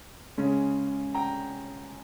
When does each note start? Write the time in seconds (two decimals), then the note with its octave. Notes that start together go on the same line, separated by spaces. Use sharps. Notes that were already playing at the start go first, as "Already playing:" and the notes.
0.38 C#3 G#3 C#4
1.15 G5 A#5